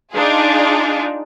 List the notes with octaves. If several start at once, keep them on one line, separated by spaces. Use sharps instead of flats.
D4 D#4 F4 G#4